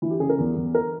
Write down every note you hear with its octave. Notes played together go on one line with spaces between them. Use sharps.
E3 E4
G4
C#3 G#4
A#4
E2
E2
A#4